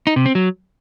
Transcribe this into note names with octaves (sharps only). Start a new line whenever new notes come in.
D#4
C3
C4
F#3